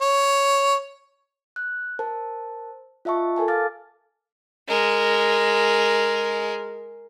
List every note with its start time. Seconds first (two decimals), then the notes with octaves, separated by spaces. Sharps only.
0.01 C#5
1.56 F#6
1.99 A#4 C5 A5
3.05 F4 D#5 E5 A5 C#6
3.36 A4 A#4 G#5 A5
3.48 F5 D6 F6 A6
4.69 G#3 A#4